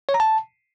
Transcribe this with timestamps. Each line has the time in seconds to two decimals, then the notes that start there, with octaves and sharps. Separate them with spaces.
0.09 C#5
0.14 A#5
0.20 A5